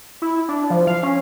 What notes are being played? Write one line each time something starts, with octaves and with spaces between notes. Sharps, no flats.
E4
D4
F3
F5
C#4